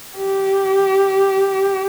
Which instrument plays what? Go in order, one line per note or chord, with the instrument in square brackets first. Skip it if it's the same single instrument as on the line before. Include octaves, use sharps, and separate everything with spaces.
[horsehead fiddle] G4